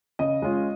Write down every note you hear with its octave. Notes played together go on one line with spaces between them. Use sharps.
C#3 D#5
G#3 C#4 F4